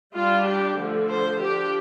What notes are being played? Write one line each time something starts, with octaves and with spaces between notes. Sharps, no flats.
G3 D4 F4
G4
D3 F3 A3
C5
F3 D4 G4